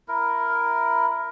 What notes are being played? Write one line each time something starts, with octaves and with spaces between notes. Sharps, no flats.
E4 A#4